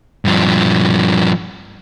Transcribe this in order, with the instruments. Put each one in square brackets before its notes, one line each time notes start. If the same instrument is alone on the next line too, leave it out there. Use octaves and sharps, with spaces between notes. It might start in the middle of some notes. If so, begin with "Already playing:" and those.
[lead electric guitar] G2 F3